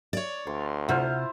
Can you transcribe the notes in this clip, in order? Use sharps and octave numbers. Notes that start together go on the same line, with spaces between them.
C#5 D5
D2 C6
C3 E4 F4 C5 F#5 F6